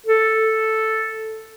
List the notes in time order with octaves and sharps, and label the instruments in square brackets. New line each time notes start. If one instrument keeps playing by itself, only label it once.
[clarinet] A4